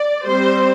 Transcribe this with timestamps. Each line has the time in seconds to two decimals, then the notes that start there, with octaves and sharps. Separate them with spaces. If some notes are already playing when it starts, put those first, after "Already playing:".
Already playing: D5
0.25 G3 C4 C5